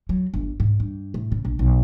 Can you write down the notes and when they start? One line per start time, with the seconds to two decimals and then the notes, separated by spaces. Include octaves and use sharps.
0.09 F#3
0.34 G1
0.60 G#2
0.80 G2
1.14 A2
1.32 C#3
1.45 A#1
1.59 B1